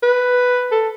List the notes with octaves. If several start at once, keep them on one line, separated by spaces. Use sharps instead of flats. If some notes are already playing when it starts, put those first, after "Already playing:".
B4
A4